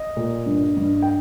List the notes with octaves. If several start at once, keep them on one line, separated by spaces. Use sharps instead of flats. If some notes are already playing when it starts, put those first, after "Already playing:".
Already playing: D#5
A#2
G2
G2
G5